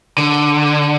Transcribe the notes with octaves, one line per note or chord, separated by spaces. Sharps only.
D3